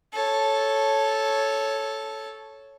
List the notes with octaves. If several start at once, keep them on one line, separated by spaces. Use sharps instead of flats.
A4 C#5